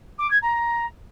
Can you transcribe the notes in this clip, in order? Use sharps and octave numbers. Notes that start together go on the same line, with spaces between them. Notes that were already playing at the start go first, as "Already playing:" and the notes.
D6
G#6
A#5